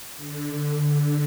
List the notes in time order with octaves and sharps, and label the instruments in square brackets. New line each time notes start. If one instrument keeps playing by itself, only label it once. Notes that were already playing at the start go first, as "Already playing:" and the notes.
[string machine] D3